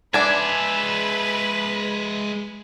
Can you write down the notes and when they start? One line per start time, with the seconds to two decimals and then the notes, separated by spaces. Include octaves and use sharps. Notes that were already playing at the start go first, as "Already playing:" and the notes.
0.14 G#3 D4 B4 D5 E5 G#5